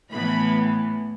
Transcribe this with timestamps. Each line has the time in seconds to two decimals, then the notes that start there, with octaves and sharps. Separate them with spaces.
0.11 A2 E3 B3 B5